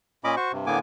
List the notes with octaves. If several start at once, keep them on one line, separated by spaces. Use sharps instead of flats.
A#2 C#4 D#5 B5 D6
F#4 C5 C#6
G2 C3
A2 D3 A#3 B3 G#5 D6